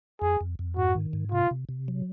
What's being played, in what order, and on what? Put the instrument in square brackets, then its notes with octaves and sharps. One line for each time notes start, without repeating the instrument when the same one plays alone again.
[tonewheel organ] F2 [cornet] G#4
[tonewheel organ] F2
F2
[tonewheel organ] G#2 [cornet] F#4
[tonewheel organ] D#3
G#2
[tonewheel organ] C3 [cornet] F4
[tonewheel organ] C3
C3
F#3